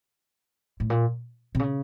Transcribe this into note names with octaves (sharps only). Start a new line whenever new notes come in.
A2
A#2
C3
C#3